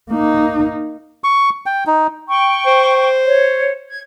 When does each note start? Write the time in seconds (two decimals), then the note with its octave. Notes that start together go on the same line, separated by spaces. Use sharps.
0.10 A#3 D#4
1.24 C#6
1.66 G5
1.87 D#4
2.28 G5 C#6
2.66 C5
3.25 C#5
3.89 G#6